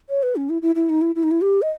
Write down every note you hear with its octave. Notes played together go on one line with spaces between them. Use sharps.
C#5
B4
C#4
E4
E4
E4
D#4
E4
E4
D#4
E4
G4
D#5